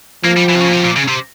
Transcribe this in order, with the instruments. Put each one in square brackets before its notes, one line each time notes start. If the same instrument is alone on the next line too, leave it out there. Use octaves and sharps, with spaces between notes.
[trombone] F3 [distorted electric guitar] A#3
[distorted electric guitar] G3
E3
C3
C#3
A#2
C3
A#2
C#3
C3